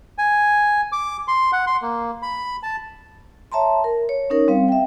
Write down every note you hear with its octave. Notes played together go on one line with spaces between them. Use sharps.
G#5
D6
C6
F#5
C6
A#3
B5
A5
C#5 E5 A5 A#5 C6
A#4
C#5
C#4 D#4 A#4 C#5
G3 C4 F5
E5 G5